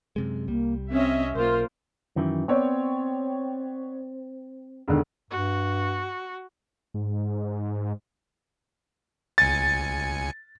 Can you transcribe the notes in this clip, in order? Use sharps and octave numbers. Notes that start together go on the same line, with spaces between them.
F#2 C3 G#3
C2 G3 A#3
C4 C#4 D#5 E5
B1 A#3 F4 A#4 C5
F#2 D#3 E3
B3 C4 C#5 D5
E1 D3 D#3
G2 F#4
G#2
C#2 G#5 A6 C#7